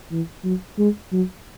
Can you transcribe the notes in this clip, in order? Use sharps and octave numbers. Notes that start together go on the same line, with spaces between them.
E3
F#3
G#3
F#3